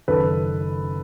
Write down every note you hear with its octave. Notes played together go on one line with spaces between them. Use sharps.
F#1 F#2 D#3 A4 B4